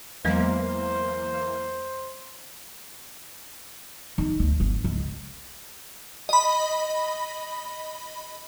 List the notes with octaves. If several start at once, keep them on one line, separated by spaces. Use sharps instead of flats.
E2 E3 F#3 G#3 A#3 B3 C5
D#3
D2
G1
C#2
D#5 B5